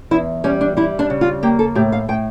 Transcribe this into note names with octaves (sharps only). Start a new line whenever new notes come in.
E2 E4
G3 C#4
D4
G3 E4
D4
C#3
F4
A#3 G4
A4
A2 G4
F5
A2 G5